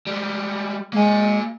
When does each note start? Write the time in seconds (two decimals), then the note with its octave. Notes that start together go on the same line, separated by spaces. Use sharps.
0.07 G3 G#3
0.93 G#3 A#3 G#5